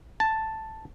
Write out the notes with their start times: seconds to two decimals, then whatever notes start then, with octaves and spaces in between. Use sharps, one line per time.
0.20 A5